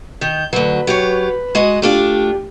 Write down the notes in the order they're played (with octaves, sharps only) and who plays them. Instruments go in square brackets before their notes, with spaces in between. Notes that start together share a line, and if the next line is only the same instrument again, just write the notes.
[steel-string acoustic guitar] D#3 [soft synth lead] G6
[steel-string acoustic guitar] D2 F#3 [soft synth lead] B4
[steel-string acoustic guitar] F#3 G4 C#5
G#3 F#4 D#5
[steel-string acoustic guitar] A3 D4 F4 [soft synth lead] G4